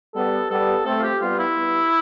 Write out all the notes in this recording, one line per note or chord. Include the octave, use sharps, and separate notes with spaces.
G3 B3 A4
G3 B3 A4
A3 C4 A4
F4
G4
G3 B3 F4
E4
G3 B3